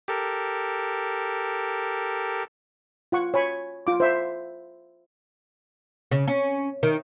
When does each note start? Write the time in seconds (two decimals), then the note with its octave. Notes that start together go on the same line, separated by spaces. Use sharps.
0.08 G4 A4 A#4
3.12 F4 F#5 C#6
3.34 C#5 G#5 B5
3.87 F4 D6
4.00 C5 E5
6.11 C#3
6.28 C#4
6.83 D#3